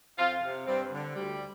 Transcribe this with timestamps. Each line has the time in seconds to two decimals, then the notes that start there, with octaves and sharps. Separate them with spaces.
0.19 F2 C4 F4
0.43 C3
0.67 G2 G3 C4
0.92 D3
1.16 D2 G3